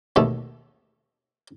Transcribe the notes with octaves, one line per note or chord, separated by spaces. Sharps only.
D#2 B2 A3